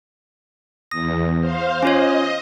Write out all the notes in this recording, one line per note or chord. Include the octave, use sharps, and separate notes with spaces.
E2 D#6 A#6
C5 F5
C#4 F4 C#5 D#5